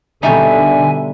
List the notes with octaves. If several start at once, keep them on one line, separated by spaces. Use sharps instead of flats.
B2 D3 G3 D#4 E5 G#5